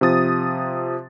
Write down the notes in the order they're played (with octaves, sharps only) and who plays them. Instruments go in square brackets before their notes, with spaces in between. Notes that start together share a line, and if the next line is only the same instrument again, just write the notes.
[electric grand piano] C3 F3 D#6 A6